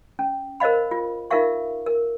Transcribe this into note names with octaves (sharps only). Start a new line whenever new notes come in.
C#4
A#4 C5 D#5 F5 B5
F4
D#4 F4 A#4 E5 F5 C#6
A#4